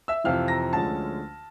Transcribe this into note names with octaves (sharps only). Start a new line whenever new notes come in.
E5 E6
F2 C3 E3 F5 F6
A#5 A#6
D2 D3 F3 G#3 C#4 A5 A6